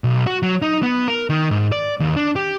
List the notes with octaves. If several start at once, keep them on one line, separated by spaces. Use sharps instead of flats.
B1
F#4
F#3
D#4
B3
A#4
D#3
G#2
D5
D#2
D4
G4